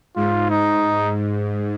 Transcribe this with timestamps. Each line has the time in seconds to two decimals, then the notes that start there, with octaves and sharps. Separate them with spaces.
0.16 G#2 F4
0.50 D#4